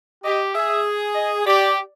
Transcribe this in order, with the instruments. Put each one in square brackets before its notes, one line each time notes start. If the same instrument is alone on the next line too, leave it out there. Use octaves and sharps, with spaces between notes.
[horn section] G4 [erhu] D#5
[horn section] G#4 [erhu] E5
[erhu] D#5
[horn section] G4 [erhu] D5